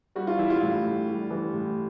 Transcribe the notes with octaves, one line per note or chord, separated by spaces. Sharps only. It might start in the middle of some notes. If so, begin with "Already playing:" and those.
G3 F#4
F4
E3 E4
F4
A2
A2
G3
E3
A2